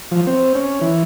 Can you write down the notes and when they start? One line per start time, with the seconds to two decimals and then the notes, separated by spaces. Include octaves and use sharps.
0.11 F3
0.27 C4
0.55 C#4
0.81 E3